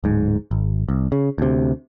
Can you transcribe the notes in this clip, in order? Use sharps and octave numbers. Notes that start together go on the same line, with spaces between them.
D1 G#2
G#1
C2
C#3
D2 C3